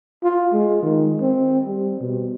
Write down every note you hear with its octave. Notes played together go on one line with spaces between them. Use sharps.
F4
G#3
D#3
C4
G3
B2